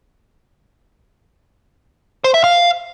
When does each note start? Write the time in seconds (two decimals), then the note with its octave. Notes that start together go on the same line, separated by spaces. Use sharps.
2.24 C5
2.34 E5
2.44 F5